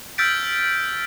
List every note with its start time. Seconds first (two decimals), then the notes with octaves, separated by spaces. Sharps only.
0.18 E6 F6 G6 A6 B6 D7